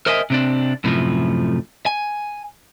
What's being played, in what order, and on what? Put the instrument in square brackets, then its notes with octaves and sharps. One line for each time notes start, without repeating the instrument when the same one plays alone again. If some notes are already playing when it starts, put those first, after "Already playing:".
[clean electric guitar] A#4 C5 D#5 E5 F#5 G#5
C3 C4 D4
F#2 A2 C3 E3 F3
G#5